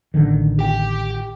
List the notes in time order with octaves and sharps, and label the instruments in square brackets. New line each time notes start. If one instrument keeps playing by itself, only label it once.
[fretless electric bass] A1 D3 D#3
[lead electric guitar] G4 G5